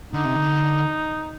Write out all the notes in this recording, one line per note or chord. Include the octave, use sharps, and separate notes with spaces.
D3 D#4
C3
D3